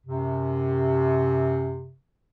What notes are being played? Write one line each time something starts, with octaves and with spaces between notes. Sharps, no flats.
F#2 C3